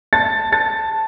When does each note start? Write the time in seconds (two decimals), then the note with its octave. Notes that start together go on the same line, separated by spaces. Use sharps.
0.13 A5 A6
0.52 A5 A6